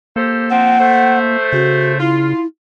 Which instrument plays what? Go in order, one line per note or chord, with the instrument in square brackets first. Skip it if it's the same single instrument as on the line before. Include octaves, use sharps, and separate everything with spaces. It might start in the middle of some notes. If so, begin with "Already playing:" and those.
[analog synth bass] A#3 [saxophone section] G4 A4 C5
[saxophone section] F3 C4 [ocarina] F#5
[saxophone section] A3 C5
[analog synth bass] C#3 [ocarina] F#4
[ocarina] E4 [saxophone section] F4